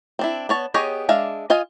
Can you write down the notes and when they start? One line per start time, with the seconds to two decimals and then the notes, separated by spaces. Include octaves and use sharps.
0.19 C4 D4 E4
0.49 B3 C#5 A5
0.74 B3 G4 G#4 C#5 D#5
1.09 G#3 D4 E5 F5
1.50 F4 D#5 F5 G#5